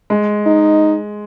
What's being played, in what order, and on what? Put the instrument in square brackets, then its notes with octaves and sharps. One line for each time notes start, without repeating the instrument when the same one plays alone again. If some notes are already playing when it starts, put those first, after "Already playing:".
[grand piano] G#3
[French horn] D#4